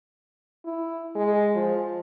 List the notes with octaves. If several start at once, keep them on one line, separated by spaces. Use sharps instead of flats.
E4
G#3
F3